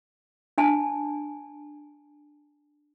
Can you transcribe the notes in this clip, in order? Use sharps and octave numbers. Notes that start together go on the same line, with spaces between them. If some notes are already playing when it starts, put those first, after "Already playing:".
D4 G#5 A5